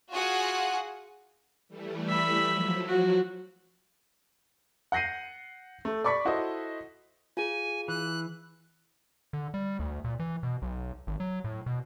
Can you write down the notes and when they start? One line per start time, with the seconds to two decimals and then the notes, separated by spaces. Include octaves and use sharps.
0.11 F4 F#4 G#4 F#5 G#5
1.68 E3 G3 A3
2.09 E5 B5
2.45 F3 F#3
2.88 F#4
4.92 F#5 G6 A#6 C7 D#7
5.85 A3
6.04 D5 B5 C#6 D6 B6
6.25 E4 F#4 A4 C5 D#5
7.37 F4 G#4 G#5
7.88 E3 F#6
9.33 D3
9.54 G3
9.79 D2
10.05 A#2
10.20 E3
10.43 B2
10.62 B1
11.07 G#1
11.20 F#3
11.44 A2
11.66 B2